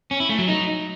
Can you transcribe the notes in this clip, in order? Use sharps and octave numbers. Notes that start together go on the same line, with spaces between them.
C#4
E4
A3
F#3
D#4